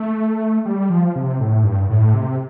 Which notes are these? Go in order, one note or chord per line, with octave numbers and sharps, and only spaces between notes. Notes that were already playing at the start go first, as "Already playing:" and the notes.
Already playing: A3
G3
F3
C3
A2
G2
A2
C3